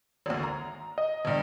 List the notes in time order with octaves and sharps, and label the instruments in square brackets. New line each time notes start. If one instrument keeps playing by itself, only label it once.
[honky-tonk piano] G#1 D2
A#5
[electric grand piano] D#5
[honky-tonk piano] G1 G2